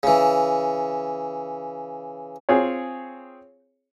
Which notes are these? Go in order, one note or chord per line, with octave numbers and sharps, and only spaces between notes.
C#3 E3
C4 F4 G#4 C#5